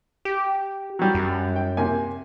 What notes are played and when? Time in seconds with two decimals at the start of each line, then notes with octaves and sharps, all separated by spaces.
0.25 G4
0.99 F#3 G3
1.15 F#2
1.56 G5
1.77 C3 A#3 G#5